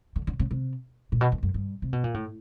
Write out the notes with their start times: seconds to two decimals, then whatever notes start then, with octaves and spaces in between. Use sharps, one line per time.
0.16 D3
0.27 D3
0.39 C#3
0.51 C3
1.12 A#2
1.21 B2
1.32 F2
1.43 F#2
1.54 G2
1.82 C3
1.93 B2
2.04 A#2
2.14 A2